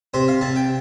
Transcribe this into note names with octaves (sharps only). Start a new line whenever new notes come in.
C3 C5
F5
C3 A5
G5